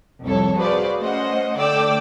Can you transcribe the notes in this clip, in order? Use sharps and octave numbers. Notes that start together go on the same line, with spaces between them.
C2 F2 A4 C#5
F#4 G#4 B4 C5 D5 F5
A3 C#4 C5 D#5 F#5
D3 A3 D5 G5 D6 E6